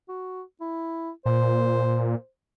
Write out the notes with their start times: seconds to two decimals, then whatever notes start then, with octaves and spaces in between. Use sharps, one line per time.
0.09 F#4
0.61 E4
1.26 A#2 C5